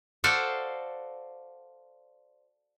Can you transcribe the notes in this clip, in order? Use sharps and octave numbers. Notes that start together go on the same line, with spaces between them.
F#4 A4 C5 D5 F5 F#5